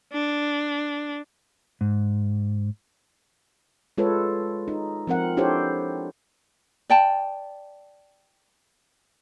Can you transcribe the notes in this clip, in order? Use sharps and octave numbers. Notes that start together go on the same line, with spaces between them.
D4
G#2
G#3 F4 A4 B4 C#5
D#4
F3 C4 A#4 F#5
D4 E4 G4 A4 C5 C#5
D5 G5 A5